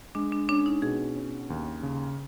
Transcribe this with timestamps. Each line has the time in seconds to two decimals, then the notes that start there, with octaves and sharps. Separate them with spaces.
0.15 G#3 D4
0.32 D4
0.49 C#4 D4
0.66 D#4
0.82 B2 G#4
1.16 C#4
1.50 D#2
1.83 C#3